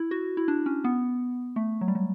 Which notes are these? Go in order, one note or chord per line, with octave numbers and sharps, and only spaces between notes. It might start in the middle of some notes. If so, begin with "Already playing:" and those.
Already playing: E4
F#4
E4
D4
C#4
B3
A3
F#3
G3
F#3